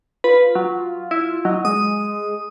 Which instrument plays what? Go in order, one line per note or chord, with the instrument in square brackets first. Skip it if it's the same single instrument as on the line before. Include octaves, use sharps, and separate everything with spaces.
[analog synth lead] F4 [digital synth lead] B4
[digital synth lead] F#3
E4
[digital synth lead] F#3 [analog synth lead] D#5
[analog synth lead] G#3 [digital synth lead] D#6